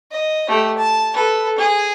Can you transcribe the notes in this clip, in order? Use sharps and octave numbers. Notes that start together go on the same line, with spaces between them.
D#5
A3 G4
A5
A4 B4
G#4